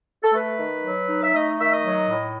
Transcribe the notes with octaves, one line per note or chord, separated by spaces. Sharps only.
A4
A3 B4
D#3
F#3
D#4
E5
A3 D#5
D#3 E5
D#5
F#3
A2